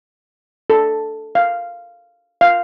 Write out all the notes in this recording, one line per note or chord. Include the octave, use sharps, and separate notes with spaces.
A4
F5
F5